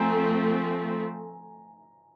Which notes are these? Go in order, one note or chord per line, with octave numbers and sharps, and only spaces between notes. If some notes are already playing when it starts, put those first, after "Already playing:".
Already playing: F3 A3 C4 G#5 A#5